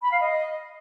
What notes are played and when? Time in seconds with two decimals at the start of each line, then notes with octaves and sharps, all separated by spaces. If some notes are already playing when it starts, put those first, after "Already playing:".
0.03 B5
0.11 F5
0.20 D#5